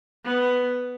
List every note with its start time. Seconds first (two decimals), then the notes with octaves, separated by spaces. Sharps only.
0.25 B3